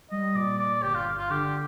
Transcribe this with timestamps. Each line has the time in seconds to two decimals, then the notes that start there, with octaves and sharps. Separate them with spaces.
0.11 G3 D#5
0.35 A#2 D5
0.59 A#2 D5
0.83 G1 G4
0.94 F4
1.06 G1
1.18 F4
1.30 D3 G4